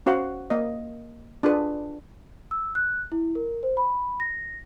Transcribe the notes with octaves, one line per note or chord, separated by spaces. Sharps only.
C#4 F#4 C5 F5 F#5
A#3 D#5
D4 F4 G#4 B4
E6
F#6
E4
A#4
C5
B5
A#6